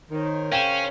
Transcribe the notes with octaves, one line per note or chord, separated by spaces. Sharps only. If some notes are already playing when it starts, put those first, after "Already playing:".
D#3 A#4 C5 C#5
C#3 C#4 F5 G5 E7